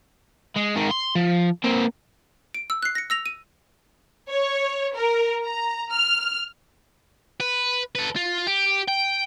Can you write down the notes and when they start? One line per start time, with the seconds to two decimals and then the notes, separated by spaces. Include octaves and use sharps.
0.56 G#3
0.76 G#2 D#3
0.91 C6
1.15 F3
1.64 A#3 C4
2.54 D7
2.70 E6
2.83 F#6 C7
2.95 A#6 C#7
3.10 E6 A#6 F7
3.26 D#7
4.29 C#5
4.94 A#4
5.44 A#5
5.91 F6
7.40 B4
7.95 A4 B4
8.16 F4
8.47 G4
8.88 G5